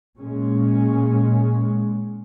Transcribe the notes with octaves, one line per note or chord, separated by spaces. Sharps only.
A#2 G#3 C#4